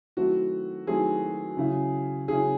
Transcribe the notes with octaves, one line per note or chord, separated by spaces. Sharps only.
D#3 F#3 A3 C4 E4 F#4
D#3 F#3 A3 C4 E4 G#4
C#3 F#3 C#4 E4
C#3 F#3 C#4 E4 G#4